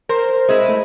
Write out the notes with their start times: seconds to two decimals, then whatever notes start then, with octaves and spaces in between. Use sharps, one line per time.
0.09 A#4 C5
0.49 G#3 E4
0.69 A3